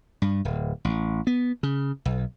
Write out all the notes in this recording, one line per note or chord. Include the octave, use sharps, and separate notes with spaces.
G2
D1
A1
B3
C#3
B1